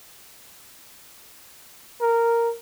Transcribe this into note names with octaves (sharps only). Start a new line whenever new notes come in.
A#4